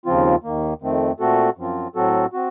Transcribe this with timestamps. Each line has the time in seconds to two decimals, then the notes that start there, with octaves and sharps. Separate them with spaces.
0.06 D#2 C#3 F3 C4 F4
0.43 D#2 D#3 A#3
0.82 F2 D#3 A3 C4
1.20 A#2 A3 C4 F#4 A4
1.57 F#2 F3 C4 F4
1.95 A2 F#3 C4 F#4 A4
2.33 C4 F#4